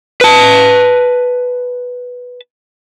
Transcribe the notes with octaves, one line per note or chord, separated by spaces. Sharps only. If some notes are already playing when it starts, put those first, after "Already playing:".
B4 A5